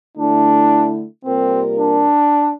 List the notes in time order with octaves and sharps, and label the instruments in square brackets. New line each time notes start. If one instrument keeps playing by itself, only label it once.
[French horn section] D3 A3 E4 [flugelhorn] D4
[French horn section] C3 G3 A#3 F4 A#4 [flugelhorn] C4
[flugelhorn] D4